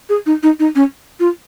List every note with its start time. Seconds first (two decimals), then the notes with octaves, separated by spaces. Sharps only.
0.09 G#4
0.26 D#4
0.43 D#4
0.60 D#4
0.76 C#4
1.20 F4